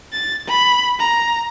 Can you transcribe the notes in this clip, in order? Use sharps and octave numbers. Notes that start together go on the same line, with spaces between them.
A6
B5
A#5